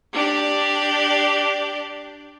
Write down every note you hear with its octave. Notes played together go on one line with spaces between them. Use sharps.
D4 G4 D5